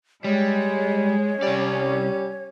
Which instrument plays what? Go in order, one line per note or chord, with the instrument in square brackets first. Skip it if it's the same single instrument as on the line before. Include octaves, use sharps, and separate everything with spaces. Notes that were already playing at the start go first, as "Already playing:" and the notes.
[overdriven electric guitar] G3 [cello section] G#3 [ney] C#5
[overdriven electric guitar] C2 D5 [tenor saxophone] G3 [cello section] C#4